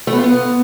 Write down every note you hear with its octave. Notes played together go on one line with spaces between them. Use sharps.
A3
B3
F4
B3